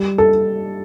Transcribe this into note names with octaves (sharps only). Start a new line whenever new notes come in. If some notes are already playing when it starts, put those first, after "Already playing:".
Already playing: G3
A4